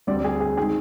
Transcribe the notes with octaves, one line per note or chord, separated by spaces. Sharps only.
D2 D3 G3 C4 D5
G#4
G#4
D#3 G#3 C4 G#4